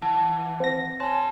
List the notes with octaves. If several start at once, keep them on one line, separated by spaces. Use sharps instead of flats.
E3 F#5 A5
C4 A#6
G4 C#5 G#5 A5 C6